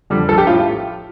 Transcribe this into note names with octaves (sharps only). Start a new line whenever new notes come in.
F2 D3 G3
A#1 A4
G4
A2 F3 F4